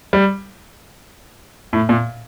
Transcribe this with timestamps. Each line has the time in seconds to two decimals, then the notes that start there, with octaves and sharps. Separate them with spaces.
0.13 G3
1.73 A2
1.89 A#2